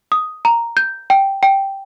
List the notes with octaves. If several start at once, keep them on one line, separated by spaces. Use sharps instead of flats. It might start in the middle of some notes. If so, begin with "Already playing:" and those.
D#6
A#5
G6
G5
G5